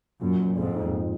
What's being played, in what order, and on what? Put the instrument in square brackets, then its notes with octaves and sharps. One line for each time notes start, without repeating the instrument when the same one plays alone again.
[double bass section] F#2 [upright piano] A#2
[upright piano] F3
[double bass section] F2 G#2 [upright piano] G#3
[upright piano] D#4
A#2